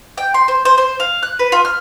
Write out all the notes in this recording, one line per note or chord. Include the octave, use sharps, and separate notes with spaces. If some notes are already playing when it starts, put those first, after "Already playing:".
G5
C6
C5
C5
C5
F5
F#6
B4
F4
F6